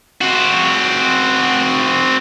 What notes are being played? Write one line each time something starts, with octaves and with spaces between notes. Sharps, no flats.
C4 F#4